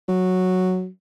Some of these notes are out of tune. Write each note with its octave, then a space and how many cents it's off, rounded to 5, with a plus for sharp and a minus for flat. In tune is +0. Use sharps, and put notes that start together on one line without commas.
F#3 -5